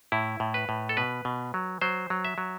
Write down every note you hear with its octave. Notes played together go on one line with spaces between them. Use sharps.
A2 E4
A2
B4
A2
A4
B2 B4
B2
F#3
F#3 C5
F#3
E5
F#3